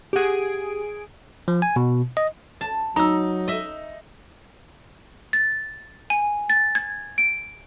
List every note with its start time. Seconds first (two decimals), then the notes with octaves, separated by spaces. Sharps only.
0.13 G4 G#4 F#5 D7
1.48 F3
1.62 G#5
1.76 B2
2.17 D#5
2.61 A5
2.96 F#3 D#4 A#5 E6
3.48 D#5 E5
5.33 A6
6.10 G#5
6.50 A6
6.75 G#6
7.18 D7